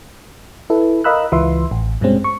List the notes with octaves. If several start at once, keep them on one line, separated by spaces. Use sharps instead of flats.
E4 A4 B4
A#4 D#5 F5 B5 E6 F#6
C#2 E3 F4 B4 E5 C6
A1
G2 B2 G3 G#3 C4 C#4
C#6